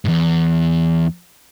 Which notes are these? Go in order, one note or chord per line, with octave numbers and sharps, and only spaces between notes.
E2 G#2